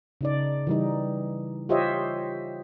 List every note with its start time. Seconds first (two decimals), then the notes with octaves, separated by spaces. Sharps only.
0.21 C#3 D#4 D5
0.67 E3 G3 D#4
1.69 F4 G4 C5 C#5 D#5 E5